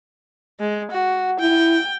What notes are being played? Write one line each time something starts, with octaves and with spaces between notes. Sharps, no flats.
G#3
F#4
E4 G5